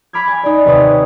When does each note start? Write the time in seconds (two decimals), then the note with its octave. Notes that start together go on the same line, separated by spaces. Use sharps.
0.13 B5 D6 F6 G#6
0.28 G#5
0.43 D#4 D5
0.65 D#2 C3 B4 C#5 D#6